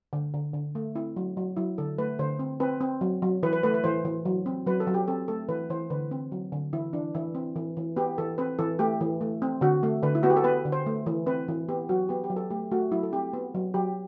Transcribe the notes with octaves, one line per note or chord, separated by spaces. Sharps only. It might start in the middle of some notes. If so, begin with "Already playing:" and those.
D3
D3
D3
A3
C4 E4
F#3
F#3
F#3 E4
D3 A4
A3 B4
D3 C5
C4
C4 B4
C4
F#3
F#3
E3 B4
B4
A3 B4
B4
E3 C5
E3
F#3
C4
F#3 B4
A4
F#3
G4
C4 A4
A3 A4
E3 B4
E3 C5
D3 B4
C4
F#3
D3
E3 E4
E3 D4
E3 E4
C4
E3
E3
B3 G4
E3 A4
C4 B4
E3 A4
A3 G4
E3
A3
C4
D3 F#4
A3
D3 B4
E4
B3 F#4
G4
A4
B3 B4
D3
C5
A3
E3
C4 B4
E3
B3 G4
F#3 F#4
B3 G4
G4
F#3
A4
A3 G4
A3 F#4
F#3 E4
A4
C4 G4
B3
F#3
F#3 G4